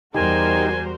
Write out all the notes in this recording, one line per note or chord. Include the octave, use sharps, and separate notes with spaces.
E2 G3 D#4 F#4 G4 A#4 C5 G#5